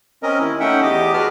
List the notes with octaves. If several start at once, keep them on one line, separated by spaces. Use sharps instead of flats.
C4 C#4 A#4 D#5
D#2 E4
A3 C#4 D#4 E5 F#5 G5
E2 B3 G4 D#5 D6
F#4 G#4 B4 A5 D6 F6